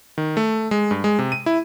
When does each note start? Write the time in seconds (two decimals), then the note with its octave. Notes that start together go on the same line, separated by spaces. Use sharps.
0.18 D#3
0.37 A3
0.71 G#3
0.91 G2
1.04 G#3
1.19 C3
1.32 D#7
1.46 E4